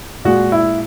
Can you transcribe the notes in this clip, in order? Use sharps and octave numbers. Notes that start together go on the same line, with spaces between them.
A#2 G#3 F#4
E4